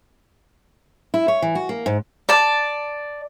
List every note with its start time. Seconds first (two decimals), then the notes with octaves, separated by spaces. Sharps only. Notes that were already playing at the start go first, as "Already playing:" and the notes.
1.14 E4
1.28 C#5
1.42 E3
1.55 F#4
1.69 A#3
1.86 G#2
2.29 D5 A5